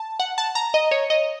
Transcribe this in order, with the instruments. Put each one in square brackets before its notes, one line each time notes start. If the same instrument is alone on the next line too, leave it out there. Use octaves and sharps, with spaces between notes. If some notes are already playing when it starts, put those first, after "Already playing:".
Already playing: [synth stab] A5
F#5
A5
A#5
D#5
C#5
D#5